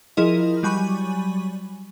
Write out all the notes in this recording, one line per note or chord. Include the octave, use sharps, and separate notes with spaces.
F3 E4 G#4 A#4 D#5
F#3 G3 G#5 B5 C#6 D#7